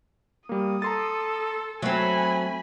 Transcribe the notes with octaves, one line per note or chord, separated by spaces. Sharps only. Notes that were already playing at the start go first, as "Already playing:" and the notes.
G3 A#3 D#6
A4 A#5 C6 A6
F#3 A3 C4 G#5 B5